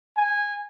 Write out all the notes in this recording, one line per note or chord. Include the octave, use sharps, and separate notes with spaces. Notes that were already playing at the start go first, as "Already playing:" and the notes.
G#5